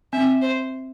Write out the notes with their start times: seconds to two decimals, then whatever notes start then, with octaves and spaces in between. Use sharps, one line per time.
0.13 C4 E5
0.42 C5